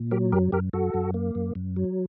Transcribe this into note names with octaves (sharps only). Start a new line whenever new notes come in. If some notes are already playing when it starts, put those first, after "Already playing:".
Already playing: A#2
F#3 G4 A#4
F#2 G4 A#4
F#2 G4 A#4
F#2 F#4 A4
F#2
A#3
F#2
F#2
F#3